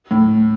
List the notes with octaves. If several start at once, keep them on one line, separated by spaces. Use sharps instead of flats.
A2